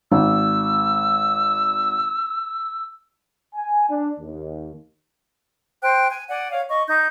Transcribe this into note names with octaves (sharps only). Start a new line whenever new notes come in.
G#1 E6
G#5
D4
D#2
C5 G5 F#6
G#5
D5 F#5 G#5
C#5 F5
D#5 C#6
D#4 G6